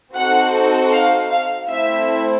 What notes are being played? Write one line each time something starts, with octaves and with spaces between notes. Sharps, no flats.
C4 D#4 F#4 A4 F#5
F5
F5
A3 C4 E4 E5